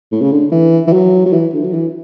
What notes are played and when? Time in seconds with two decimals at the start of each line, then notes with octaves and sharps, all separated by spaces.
0.12 A2
0.21 C#3
0.32 D3
0.52 E3
0.87 E3
0.93 F#3
1.26 F#3
1.33 E3
1.53 D3
1.64 F#3
1.73 E3